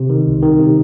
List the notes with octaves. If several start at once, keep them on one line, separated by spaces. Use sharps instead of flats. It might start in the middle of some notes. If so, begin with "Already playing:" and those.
Already playing: C3
D#3
C2
D#3
C3